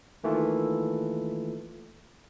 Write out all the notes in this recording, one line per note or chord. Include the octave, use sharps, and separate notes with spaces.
D#3 E3 A3 A#3 F4 A4